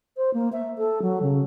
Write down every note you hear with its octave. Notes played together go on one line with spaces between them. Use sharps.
C5
A#3
E5
A4
F#3
C#3